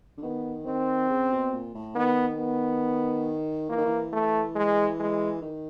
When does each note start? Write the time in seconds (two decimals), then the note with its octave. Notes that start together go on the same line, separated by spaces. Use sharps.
0.18 D3
0.22 D#3 B3
0.66 D#3 C4
1.10 C#3
1.32 B2
1.52 A#2
1.75 A2
1.96 D#3 B3
2.39 B3
3.69 E3 A#3
3.78 D#3
3.85 E3
4.13 A3
4.55 G#3
5.00 G#3
5.42 D#3